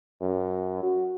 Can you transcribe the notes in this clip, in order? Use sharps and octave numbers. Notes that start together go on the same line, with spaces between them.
F#2
F#4